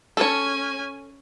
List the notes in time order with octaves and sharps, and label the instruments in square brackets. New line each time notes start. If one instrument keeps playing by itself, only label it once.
[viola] C#4 G#5 [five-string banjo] A4 C#5